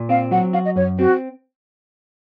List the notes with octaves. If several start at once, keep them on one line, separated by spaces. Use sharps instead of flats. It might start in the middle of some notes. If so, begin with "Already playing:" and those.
Already playing: A#2
C4 F5
F#3 F#5
F#4 F5
D#5
F#2 C#5
C4 F#4